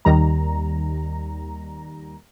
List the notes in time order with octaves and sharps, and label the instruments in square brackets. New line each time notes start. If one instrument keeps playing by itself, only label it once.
[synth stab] D#2 D#3 G3 A#5